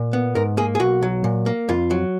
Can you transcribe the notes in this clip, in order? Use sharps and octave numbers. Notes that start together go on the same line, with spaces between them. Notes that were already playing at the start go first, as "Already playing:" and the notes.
Already playing: A#2
B3
G#2 A#4
A#3 G#4
G#4
B1 F#4
F#3
A#2
A#3
F2 F4
F#3